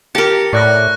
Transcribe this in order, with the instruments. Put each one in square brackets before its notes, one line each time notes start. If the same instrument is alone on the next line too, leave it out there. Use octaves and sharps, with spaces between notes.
[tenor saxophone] G4 [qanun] A#4 A5 [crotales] C#7
[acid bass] A2 [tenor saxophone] D5 [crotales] C#6 F#6 A#6